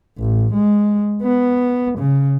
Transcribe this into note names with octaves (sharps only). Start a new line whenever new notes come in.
A1
G#3
B3
C#3